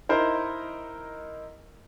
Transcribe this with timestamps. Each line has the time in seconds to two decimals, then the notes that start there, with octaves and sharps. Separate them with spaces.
0.09 D#4 E4 A#4 C5